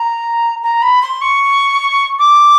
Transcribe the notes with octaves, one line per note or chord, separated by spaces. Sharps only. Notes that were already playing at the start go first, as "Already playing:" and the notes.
Already playing: A#5
A#5
B5
C6
C#6
D6